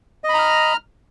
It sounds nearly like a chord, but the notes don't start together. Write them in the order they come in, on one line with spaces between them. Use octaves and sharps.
D#5 B5 A#5 F6